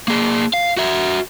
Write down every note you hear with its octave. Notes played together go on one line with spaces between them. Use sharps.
A#3 G#4
F5
F#4 E5